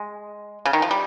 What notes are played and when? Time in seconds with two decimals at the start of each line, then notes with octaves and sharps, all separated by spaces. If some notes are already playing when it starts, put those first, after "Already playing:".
Already playing: G#3
0.66 C#3
0.73 D#3
0.82 F3
0.91 G3